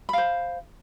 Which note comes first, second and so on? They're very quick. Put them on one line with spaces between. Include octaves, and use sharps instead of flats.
B5 F5 C5